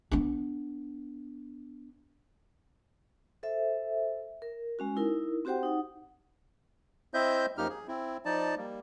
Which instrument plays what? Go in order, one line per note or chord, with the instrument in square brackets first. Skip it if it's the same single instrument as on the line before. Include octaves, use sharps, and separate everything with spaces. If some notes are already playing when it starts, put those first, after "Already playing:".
[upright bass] B3 D4
[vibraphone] A4 C5 E5
A#4
G#3 C#4 F#4
D#4 E4 A#4
C4 F#4 G4 C5 F#5 G5
D#4 F#5
[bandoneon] C4 E4 C5 D#5 E5 G6
F#2 F3 A#3 D#4 G4 F6
G#4
C4 E4
F3 D#4 D5 A5
G3 A#3